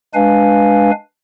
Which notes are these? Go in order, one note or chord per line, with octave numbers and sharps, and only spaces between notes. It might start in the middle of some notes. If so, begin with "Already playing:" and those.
G#3 D4 B4 F5 G#5